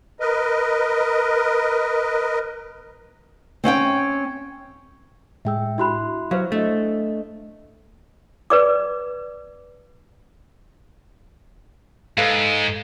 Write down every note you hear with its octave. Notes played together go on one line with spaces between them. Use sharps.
A#4 B4 D#5
C4 C#4 F#5 G5
A2 G#3 G#4 E5 G5 E6
D4 E4 F#4 E5 B5 C6 F#6
F#3 B4 C5 F5
A3 D4 D#5
B4 D5 D6
G#2 A4 B4 F5